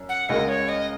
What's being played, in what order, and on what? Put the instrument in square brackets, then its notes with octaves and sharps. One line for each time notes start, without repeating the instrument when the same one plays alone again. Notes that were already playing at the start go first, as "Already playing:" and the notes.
Already playing: [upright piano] F#2
[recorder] F#5
[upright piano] C#2 C#3 G#3 F#4 A#4 [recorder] D#5
[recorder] C#5
D#5